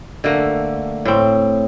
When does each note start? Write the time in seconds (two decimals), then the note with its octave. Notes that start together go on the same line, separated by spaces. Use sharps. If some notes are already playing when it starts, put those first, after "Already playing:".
0.24 D3 A3 A#3
1.05 A2 C4